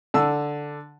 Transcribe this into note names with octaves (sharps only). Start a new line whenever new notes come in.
D3 A5 E6